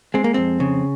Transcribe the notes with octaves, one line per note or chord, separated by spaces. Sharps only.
G#3 C4
A#3
F2 C4
C#3